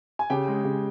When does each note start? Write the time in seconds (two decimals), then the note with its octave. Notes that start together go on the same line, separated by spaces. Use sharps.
0.19 G#5
0.30 C#3 G4 G5
0.48 G#3
0.65 C#3